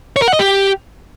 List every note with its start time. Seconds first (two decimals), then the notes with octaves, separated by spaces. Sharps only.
0.16 C#5
0.22 A#4
0.28 F#5
0.33 D#5
0.39 G4